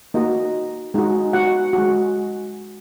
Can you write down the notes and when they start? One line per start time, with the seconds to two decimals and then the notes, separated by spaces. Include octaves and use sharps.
0.14 A#3 D#4 F#4 D#5
0.94 G#3 D#4 F#4
1.33 F#4 F#5
1.73 F#4
1.78 G#3